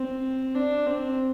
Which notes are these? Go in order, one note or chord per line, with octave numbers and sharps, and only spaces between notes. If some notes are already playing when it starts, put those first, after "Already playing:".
Already playing: C4
D4
C4